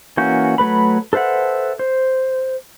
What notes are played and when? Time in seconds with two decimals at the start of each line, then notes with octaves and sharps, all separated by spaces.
0.17 E3 A#3 C#4 F#4 G6
0.58 F#3 A3 B4 B5
1.13 A4 B4 C5 E5 F#5
1.79 C5